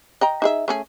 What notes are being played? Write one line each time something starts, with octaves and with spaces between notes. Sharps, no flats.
D#5 G5 A#5
D#4 G#4 E5
A3 C#4 G#4